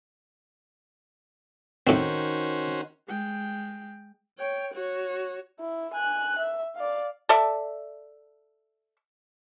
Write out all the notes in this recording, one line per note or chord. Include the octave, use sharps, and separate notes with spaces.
A2 D#3 C4 C#4 F#4 C5
G#3 G5
C#5 G5
F#4 C#5
E4
G#5 F#6
E5
D5 F5
A4 D5 E5